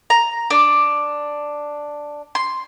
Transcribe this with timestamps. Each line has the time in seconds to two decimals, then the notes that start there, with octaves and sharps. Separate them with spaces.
0.10 A#5
0.50 D4
2.35 C6